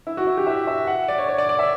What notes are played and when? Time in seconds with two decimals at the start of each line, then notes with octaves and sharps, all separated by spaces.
0.07 E4
0.17 F#4
0.27 E4
0.37 G4
0.47 E5
0.67 E5
0.87 F#5
1.08 D5
1.18 C#5
1.28 C#5
1.38 D5
1.49 D5
1.59 E5